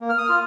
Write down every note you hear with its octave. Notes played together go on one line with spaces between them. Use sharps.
A#3
F6
D#6
F4 F6